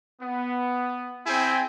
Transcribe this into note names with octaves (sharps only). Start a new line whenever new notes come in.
B3
C4 E4 G#4 G5 G#5